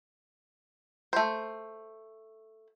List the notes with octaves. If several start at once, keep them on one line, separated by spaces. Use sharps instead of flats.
A3 C5